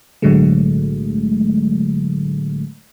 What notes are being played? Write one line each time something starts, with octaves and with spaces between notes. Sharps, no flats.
B1 A2 D3 F#3 G#3 A3